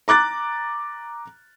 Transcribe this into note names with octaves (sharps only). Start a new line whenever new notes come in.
A#5 D6 F#6 A6